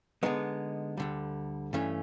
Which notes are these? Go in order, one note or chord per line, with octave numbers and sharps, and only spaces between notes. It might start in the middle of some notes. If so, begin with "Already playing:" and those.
D3 F3 G#3 B3 D#4
D2 D3 G3
G2 E3 A3 C#4